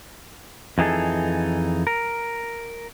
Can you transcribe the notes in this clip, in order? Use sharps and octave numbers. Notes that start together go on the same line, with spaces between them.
F2 E3 D#4 G#4 A4
A#4